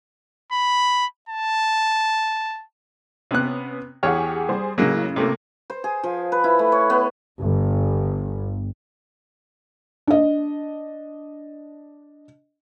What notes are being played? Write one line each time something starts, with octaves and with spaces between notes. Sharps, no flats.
B5
A5
C3 B3 C#4 F#6
E2 G4 G#4 C#5 F#5 F6
G3 G#4 C5
A2 C#3 F#3 G#3 A#3
C3 A3 A#3
C5
G#4
F3
B4
E4
A3
C#5
B3
G1
D4 D#5